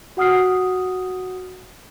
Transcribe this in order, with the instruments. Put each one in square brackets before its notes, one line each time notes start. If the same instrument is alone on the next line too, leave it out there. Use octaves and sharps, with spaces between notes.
[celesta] F#4 F#5 D#6 F6 C7